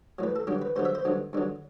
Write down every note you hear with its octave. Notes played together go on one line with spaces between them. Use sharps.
A2 F#3 B4
A4
G2 D3 F#3 G4
B4
G2 D3 F#3 C5
E5
C5
G2 D3 F#3
G2 D3 F#3